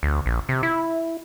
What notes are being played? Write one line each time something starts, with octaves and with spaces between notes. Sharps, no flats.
D2
A#1
C3
E4